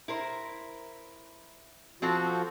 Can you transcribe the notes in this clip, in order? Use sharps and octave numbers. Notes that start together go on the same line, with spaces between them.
E4 A#4 C5
F3 C4 F4 F#4 A4